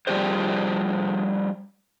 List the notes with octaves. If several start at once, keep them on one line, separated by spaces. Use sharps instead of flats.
F3 G3 D4 G4 G#4 C5